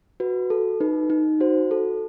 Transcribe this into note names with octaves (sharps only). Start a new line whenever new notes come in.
F#4 B4
A4
D#4 B4
D#4
F#4 C5
A4